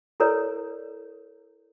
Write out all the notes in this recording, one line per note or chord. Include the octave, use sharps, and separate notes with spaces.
E4 A4 A#4 C#5 D5